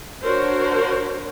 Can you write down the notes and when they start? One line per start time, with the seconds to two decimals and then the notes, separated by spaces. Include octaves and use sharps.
0.23 D4 F#4 A#4 C5 C#5